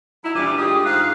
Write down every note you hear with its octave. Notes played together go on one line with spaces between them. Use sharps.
F#3 D#4 E4
E3 G3 D4 F4 D6
G#3 A3 G4 D#6
G#2 F5 F#6